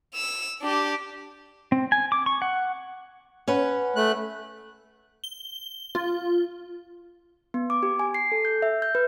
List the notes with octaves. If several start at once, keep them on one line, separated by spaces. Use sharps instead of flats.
E6 F7
D4 G4
C4
G#5
D6
C#6
F#5
C#4 B4 F#5
A3 F#6
G7
F4
B3
D6
G4
G#5
C7
A4
G6
E5
G6
B4